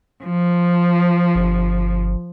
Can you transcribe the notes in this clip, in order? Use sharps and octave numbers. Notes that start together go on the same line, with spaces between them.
F3
G1